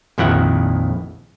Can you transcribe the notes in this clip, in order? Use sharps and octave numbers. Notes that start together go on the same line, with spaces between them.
A#1 F2 D#3 E4 F#5